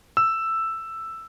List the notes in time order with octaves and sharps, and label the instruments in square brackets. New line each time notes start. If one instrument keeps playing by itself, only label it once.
[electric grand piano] E6